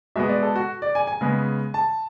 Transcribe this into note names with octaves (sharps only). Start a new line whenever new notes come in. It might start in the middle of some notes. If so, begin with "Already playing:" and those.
B2 G#3 B3 E5
D5
A4
F#4
D5
G#5
G#5
C#3 G#3 B3
A5